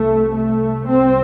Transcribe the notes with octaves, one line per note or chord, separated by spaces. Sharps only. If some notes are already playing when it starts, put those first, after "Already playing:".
Already playing: C2 C3 A3
A3
C2 C3 C4